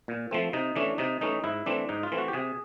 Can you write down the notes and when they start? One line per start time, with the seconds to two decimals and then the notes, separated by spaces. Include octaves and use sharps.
0.08 A#2
0.31 F3 A3 C4
0.53 C3 D#4
0.76 E3 A3 C#4 D4
0.98 C3 D#4
1.21 E3 A3 C#4 D#4
1.44 G#2 E4
1.66 E3 A3 C4 D4
1.89 G#2 D#4
2.03 F4
2.12 E3 A3 C4
2.18 F#4
2.28 G4
2.33 C3 G#4